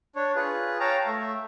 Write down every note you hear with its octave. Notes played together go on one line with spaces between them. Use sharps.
D4 C#5
F4 G#4 B4
C#5 F5 G5 A5 A#5
A3 E5